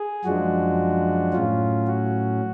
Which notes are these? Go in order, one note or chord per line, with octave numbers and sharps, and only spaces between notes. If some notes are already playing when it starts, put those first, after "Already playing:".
Already playing: G#4
F#2 F3 G#3 D4 F#4
A2 F#3 C#4 F4
F#4